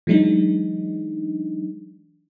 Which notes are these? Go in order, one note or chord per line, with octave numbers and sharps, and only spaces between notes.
E3 F#3 G#3 D4 D#4